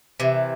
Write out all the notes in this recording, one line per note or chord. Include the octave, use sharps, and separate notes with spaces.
C3 E3